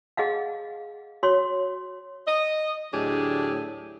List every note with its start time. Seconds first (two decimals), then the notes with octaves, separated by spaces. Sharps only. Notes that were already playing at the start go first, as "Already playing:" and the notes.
0.17 G#4 D#5 F5 F#5
1.23 F#4 C#5 C6
2.27 D#5
2.93 D2 A2 F#3 D4 G4 G#4